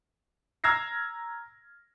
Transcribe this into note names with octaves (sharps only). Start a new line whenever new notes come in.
A#5 E6 F6 G#6 A#6 C7